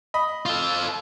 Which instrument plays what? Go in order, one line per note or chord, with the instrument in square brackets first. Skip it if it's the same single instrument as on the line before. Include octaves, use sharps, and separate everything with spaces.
[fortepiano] D#5 B5
[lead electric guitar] F4 A4